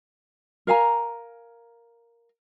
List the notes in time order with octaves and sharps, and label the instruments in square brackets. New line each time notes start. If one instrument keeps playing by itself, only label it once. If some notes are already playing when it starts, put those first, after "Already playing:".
[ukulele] A#4 F5 G#5 A#5